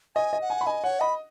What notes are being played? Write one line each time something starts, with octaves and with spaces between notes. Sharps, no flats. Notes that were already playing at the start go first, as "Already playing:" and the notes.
D#5 G#5
D#5
F#5
G#5
B5
D#5 G#5
C#5 F#5
D#5 B5